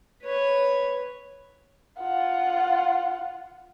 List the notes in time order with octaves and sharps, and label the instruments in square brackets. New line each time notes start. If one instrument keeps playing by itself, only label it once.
[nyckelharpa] B4 C#5
[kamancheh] F4 F#5